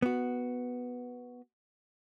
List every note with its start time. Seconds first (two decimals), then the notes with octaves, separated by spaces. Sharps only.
0.02 B3 F#4